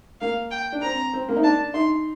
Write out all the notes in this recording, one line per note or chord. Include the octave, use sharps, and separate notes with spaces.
A#3 F5
G5
D4
C4 A#5
C4
A#3
D#4
D4 A5
D#4 C6